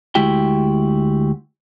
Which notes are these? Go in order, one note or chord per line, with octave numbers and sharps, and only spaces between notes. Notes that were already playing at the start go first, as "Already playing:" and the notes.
D2 G#3 E4 F#4 G4 G5